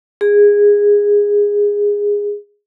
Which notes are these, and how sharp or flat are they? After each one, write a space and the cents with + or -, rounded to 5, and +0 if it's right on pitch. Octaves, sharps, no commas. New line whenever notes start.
G#4 -15